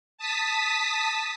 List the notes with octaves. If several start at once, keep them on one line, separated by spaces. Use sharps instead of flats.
A5 D#6 B6